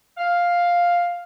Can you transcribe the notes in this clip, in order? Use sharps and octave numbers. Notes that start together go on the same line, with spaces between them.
F5